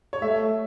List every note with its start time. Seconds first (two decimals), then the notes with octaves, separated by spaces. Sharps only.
0.13 C#5
0.22 A3 E5